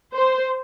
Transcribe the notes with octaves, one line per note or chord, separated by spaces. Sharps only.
C5